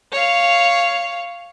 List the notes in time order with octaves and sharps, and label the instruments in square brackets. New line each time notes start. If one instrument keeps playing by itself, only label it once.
[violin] C#5 F5